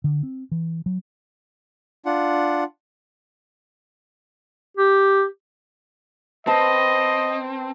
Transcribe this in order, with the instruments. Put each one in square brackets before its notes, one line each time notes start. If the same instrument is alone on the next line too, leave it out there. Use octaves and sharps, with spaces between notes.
[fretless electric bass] D3
C4
E3
F#3
[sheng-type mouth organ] D4 F4 F#5
[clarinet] G4
[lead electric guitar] C4 [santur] B4 A5 [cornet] D#5